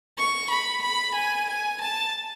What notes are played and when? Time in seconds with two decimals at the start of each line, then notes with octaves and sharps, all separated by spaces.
0.16 C#6
0.49 B5
0.82 B5
1.14 G#5
1.47 G#5
1.80 A5